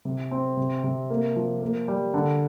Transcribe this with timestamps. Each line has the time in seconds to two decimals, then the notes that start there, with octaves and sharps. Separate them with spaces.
0.05 C3
0.31 C4
0.57 C3
0.84 C3
1.10 A#3
1.36 F3
1.62 A#3
1.88 G3
2.14 D3